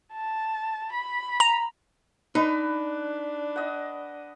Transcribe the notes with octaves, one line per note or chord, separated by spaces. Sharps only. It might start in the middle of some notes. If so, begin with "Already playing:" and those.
A5
B5
A#5
D4 D#4 B4
D#5 F#5